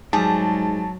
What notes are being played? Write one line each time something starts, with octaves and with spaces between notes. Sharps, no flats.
G#2 F#3 G3 G#4 A5